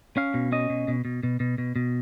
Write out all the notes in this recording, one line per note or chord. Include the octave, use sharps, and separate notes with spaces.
C#4 F5
B2
C#4 D#5
B2
B2
B2
B2
B2
B2
B2